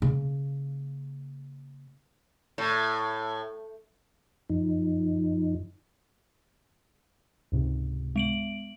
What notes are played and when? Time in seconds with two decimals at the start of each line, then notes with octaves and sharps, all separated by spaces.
0.02 C#3 A#3
2.58 A2
4.50 F#2 F3 D#4
7.52 C#2 G#2 C3
8.16 G#3 D7 F#7